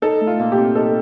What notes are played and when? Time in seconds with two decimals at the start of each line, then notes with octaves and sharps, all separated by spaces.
0.02 D#4 A4
0.21 A3
0.27 F4
0.39 A#2
0.52 G4
0.58 C4
0.75 D#4 A4